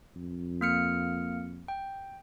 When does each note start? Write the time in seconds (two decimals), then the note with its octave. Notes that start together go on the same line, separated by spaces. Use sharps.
0.16 F2
0.61 A#3 F6 C#7
1.68 G5